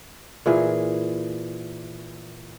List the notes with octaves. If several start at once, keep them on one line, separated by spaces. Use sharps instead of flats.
A#2 E3 G#4